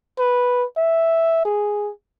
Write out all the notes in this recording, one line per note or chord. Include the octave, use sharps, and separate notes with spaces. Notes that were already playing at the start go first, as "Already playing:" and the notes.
B4
E5
G#4